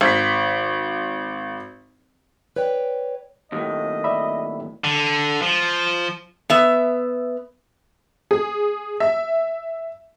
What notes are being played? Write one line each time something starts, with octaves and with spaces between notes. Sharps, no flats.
G#1 B6
B4 C#5 D5 G5
D#2 A2 D#5
D5 E5 B5
D3
F3
B3 E5
G#4
E5